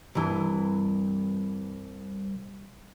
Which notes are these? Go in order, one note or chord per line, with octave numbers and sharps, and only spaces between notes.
C2 G2 E3